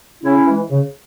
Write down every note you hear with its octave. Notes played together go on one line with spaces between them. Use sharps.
C#3 C#4 E4
E3 G#3
C#3